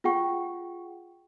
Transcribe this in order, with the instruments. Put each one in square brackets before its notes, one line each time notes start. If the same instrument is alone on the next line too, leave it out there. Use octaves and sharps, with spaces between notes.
[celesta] F4 G#4 F#5 G5 C#6